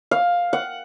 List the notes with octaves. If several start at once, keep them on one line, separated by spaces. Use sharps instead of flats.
F5
F#5